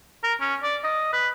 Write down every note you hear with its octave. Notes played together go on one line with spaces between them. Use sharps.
A#4
C#4
D5
D#5
B4